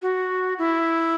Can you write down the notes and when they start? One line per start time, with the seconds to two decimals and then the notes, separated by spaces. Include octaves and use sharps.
0.02 F#4
0.59 E4